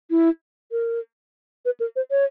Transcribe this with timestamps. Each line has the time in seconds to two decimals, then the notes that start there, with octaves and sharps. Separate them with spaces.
0.11 E4
0.72 A#4
1.65 B4
1.80 A#4
1.96 C5
2.11 C#5